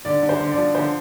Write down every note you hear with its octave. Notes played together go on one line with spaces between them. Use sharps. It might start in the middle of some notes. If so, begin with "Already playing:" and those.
D3 D5
D3
C5
D3
D5
F3
D3 C5